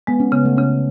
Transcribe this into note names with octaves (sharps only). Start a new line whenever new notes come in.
G#3 B3
C#4
C#3 B3
A3
C#3 C#4